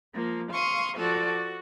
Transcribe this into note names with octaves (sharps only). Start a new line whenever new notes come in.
F3 A#3
F5 C6 C#6 D#6
F3 F#4 A4 D5
F#4